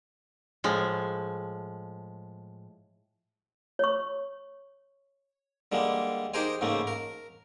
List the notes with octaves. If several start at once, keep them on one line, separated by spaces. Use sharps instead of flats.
A2 F3 G#3
C#5 C#6
D3 G3 G#3 A#3
D#4 G4 G#4 A#4 C5 G#5
G#2 C#3 A3 A#3
A#4